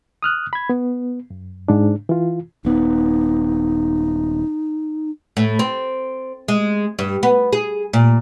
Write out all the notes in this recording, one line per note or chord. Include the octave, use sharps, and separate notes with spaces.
D#6 F6 F#6
B5 G#6
B3
F#2
G#2 D4
E3 F4
D#1 B3 D#4
A2
C4
G#3
G2
B3
G#4
A#2